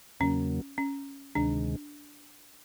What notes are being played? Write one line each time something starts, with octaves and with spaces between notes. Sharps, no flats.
E2 C#3 F#3 A#3 C#4
C#4
D2 C3 D#3 G#3 D4